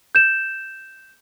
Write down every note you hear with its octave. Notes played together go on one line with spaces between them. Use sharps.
G6 E7